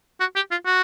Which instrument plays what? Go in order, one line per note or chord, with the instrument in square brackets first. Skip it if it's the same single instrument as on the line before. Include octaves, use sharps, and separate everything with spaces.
[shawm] F#4
G4
F4
F#4